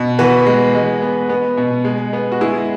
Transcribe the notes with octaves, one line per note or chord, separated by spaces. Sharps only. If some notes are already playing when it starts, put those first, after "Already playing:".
Already playing: B2
E3 F#4 B4
G#3
G#3
B3
B3
B2
G#3
B3
F#4
G#3 E4 G#4